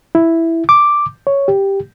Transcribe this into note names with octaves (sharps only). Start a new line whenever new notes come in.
E4
D6
C#5
G4